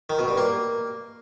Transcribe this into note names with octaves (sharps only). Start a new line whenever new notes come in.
D#3
B2
G2
A#3